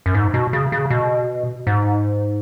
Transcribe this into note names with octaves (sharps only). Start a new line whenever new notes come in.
F#2
G#2
B2
C#3
C#3
B2
G#2